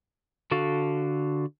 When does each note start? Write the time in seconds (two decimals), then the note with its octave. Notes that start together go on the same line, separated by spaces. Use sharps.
0.51 D3 F#4 A4 F5